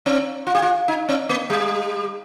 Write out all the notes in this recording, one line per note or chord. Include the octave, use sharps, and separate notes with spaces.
C4
F4
G4
F4
D#4
C4
A#3
G3